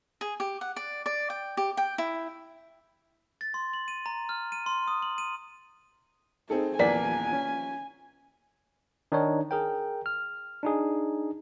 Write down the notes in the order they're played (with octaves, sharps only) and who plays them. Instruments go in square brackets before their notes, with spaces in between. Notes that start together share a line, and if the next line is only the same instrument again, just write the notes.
[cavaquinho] G#4
G4
F#5
D5
D5
G5
G4
G5
E4
[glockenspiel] A6
C6
F#7
D#7
A#5
F6
D#7
C6
D#6
F#7
D#7
[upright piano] C4 G#4 A4 [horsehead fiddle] D#4
[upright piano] D#1 E2 B6 [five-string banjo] F3 A#3 D5 [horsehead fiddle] G#5
[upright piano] C#4
[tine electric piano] D#3 D4 D#4 C#5
G#4 A#4 G5
F6
D4 D#4 G#4